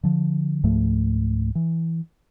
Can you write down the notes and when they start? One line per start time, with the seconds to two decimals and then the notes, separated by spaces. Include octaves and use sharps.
0.03 D3 F3
0.63 C#2 G#2 F3 A3
1.55 E3